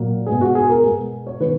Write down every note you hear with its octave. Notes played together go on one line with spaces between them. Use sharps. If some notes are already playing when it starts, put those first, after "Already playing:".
Already playing: A#2 F#3 A#3
B2 G#3 B3 G#4
F#4
G#4
A#4
B2 G#3 B3 G#4
C#5
D#3 G#3 B3 B4